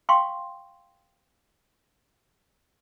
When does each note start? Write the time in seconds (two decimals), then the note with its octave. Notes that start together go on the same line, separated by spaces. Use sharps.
0.09 F5 G5 C6 C#6